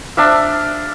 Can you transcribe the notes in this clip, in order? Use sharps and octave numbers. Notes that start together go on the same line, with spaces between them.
D4 E5 F5